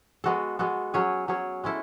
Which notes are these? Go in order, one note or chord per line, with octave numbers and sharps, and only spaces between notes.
G#3 B3 F#4 A4
G#3 B3 F#4 A4
F#3 C#4 G#4 C#5
F#3 C#4 G#4 C#5
G#3 C#4 E4 A4